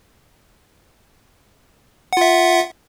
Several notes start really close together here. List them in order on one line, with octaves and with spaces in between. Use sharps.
F#5 F4 E5